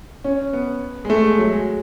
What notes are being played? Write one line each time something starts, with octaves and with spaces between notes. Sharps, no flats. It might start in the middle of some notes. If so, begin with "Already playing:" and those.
C#4
B3
G#3
A3
G#3
F#3
G#3